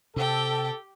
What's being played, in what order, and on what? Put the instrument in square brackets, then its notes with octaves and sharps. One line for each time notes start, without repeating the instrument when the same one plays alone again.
[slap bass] C3 [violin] G4 G5 [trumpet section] A4